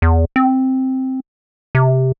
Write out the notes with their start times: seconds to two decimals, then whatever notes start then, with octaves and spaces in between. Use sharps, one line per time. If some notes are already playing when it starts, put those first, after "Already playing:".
0.02 E2
0.36 C4
1.75 C3